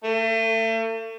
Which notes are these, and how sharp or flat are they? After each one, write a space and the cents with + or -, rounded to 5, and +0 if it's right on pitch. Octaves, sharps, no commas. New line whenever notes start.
A3 +35